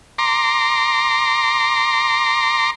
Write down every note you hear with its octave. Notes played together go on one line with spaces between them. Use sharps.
A#5 C6 D6